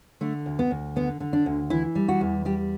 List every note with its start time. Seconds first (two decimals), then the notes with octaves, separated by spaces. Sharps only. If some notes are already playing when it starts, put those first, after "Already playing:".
0.21 D3 A3
0.46 D2
0.59 B3
0.71 D2
0.96 D3 B3
1.20 D3
1.33 D4
1.46 D2
1.70 E3 E4
1.95 G3
2.08 F#4
2.21 E2
2.45 G3 G4